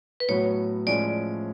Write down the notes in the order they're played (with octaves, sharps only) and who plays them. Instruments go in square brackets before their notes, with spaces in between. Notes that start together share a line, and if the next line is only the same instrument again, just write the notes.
[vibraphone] B4
[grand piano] A2 F#3 B3 F#4 [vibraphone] C#5
[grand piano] A2 F3 G#3 C#4 [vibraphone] D5